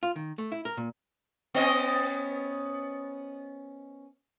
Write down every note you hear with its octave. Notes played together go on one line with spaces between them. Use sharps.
F4
D#3
A3
E4
A#4
A#2
B3 C#4 D#5